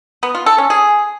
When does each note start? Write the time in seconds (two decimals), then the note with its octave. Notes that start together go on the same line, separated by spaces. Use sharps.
0.23 B3
0.35 F4
0.46 A4
0.58 C#4
0.70 G#4